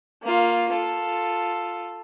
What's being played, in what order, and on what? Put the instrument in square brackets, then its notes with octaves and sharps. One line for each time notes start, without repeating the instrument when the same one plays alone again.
[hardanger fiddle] A#3 F4
F4 A4